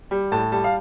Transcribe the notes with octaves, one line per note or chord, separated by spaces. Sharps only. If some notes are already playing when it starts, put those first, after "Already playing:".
G3
A2 A5
G3 A5
F5